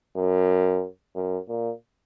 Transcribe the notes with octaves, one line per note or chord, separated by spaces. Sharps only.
F#2
F#2
A#2